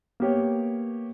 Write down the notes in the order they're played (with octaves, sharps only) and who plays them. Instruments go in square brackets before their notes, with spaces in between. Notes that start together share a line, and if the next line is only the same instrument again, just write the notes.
[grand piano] A#3 B3 G4 C#5